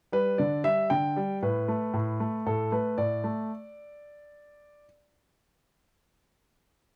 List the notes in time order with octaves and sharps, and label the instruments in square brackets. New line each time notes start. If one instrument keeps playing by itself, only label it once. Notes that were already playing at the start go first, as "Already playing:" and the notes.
[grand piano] G3 B4
D3 D5
G3 E5
D3 G5
G3
A2 B4
A3
A2
A3
A2 A4
A3 B4
A2 D5
A3